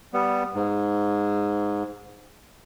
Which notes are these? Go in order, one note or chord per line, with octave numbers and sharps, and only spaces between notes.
G3 B3
G#2